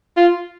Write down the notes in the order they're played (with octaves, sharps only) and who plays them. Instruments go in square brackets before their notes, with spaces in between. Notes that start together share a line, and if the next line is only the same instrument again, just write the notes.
[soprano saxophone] F4